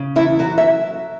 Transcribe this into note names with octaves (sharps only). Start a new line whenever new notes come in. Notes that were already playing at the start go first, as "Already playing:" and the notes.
Already playing: C#3
E2 E4
F#3 F#4
E5